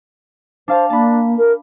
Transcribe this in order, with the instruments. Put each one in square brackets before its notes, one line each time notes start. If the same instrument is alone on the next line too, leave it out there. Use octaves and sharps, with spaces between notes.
[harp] D4 F5 A5 [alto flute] C5
[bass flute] A#3 [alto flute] D4 [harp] A5 B5
[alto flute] A#4